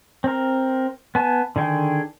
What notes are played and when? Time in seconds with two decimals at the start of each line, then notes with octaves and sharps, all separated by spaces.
0.24 C4 A#4
1.15 B3 G#5 A5
1.56 D3 D#3 G#4 G5